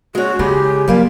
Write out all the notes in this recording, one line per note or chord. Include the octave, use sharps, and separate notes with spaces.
G#3 C#4 F#4
C#3 G#3 E4 G4 G#4
F#3 G3 A#3 F4